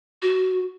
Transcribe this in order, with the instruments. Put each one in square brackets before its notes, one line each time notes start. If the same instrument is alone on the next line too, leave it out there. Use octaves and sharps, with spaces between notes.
[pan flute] F#4